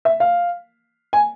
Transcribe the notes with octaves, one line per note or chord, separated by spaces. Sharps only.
E5
F5
G#5